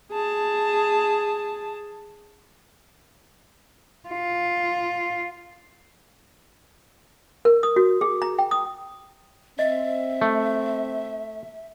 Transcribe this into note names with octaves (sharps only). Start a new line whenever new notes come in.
G#4 A5
F4
A#4
D#6
F#4
G#4
A#5
G5
D#6
C4 D#5 E5
A3